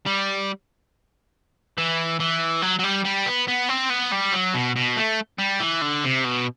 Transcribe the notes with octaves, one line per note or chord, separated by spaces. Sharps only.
G3
E3
E3
F#3
F#3
G3
G3
B3
B3
C4
B3
G3
F#3
B2
B2
A3
G3
E3
D3
C3
B2